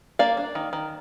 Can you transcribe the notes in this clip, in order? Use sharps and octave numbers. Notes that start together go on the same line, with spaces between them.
A#3 D5 F5
D4
D#3
D#3